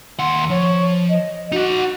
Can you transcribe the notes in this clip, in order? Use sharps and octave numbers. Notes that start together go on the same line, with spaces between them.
D#2 F#5 C6
F3 C#5
D#5
D#4 F#4 F#5